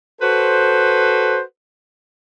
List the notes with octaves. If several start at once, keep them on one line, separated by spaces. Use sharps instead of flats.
F#4 A4 B4 C5